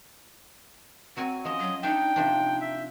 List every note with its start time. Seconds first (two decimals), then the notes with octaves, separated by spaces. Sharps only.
1.17 F#3 C4 F#4 G#5
1.45 F3 C#4 D#5
1.60 F#3
1.83 D4 D#4 E5 G5
2.16 C3 F3 D4
2.61 E5